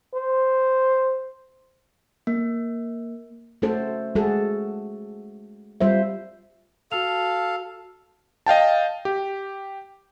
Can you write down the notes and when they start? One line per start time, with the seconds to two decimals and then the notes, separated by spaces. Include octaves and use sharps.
0.15 C5
2.27 A#3
3.62 A3 C#4 F#4 A4 C5
4.15 G#3 F#4 G#4 A4
5.81 G3 F4 C5 E5
6.92 F#4 A4 F5 A5 F7
8.46 D#5 F5 G5 A5
9.05 G4